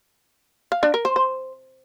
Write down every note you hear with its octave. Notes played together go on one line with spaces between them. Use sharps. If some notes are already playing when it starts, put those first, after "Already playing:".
F5
D4
A#4
C5
C5